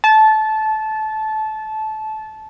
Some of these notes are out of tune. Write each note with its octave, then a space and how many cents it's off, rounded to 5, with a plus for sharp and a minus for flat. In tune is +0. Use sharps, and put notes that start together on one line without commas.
A5 -20